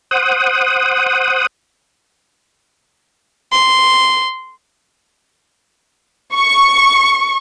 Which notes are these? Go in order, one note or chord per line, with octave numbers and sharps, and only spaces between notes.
C5 F#5 D#6
C6
C#6